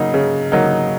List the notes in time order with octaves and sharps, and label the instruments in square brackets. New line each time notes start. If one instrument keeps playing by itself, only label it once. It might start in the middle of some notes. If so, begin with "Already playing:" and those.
Already playing: [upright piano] C#3 F#3 A#3 D#4
C#3
F#3 A#3 D#4